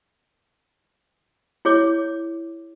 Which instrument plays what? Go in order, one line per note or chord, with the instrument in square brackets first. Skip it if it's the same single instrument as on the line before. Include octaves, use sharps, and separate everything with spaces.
[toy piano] E4 G#4 C#5 D6